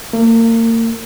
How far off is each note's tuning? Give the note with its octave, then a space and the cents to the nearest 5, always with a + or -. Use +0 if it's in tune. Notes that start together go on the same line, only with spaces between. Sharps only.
A#3 -35